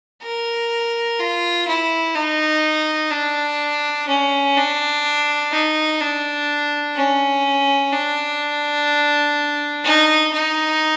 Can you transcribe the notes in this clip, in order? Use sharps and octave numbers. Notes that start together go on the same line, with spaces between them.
A#4
F4
E4
D#4
D4
C#4
D4
D#4
D4
C#4
D4
D#4
D#4